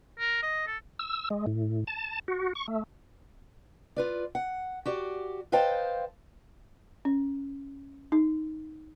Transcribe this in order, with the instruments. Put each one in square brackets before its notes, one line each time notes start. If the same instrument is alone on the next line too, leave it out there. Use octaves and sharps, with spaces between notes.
[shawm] A#4
D#5
A4
[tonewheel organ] E6
G#3
A2
A5
F#4
C#6
A3
[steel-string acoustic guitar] F4 B4 D5
F#5
F#4 G4 D5
B4 C5 D#5 F5 G5 A5
[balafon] C#4
D#4